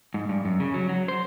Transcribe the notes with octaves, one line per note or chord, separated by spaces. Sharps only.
G#2
G2
F#2
C#3
F#3
F#3
C5